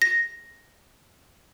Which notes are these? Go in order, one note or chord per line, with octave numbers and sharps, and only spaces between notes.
A#6